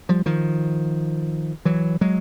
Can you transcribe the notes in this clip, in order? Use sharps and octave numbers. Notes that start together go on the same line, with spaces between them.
F3 G3
D#3 F3
E3 F#3
F#3 G#3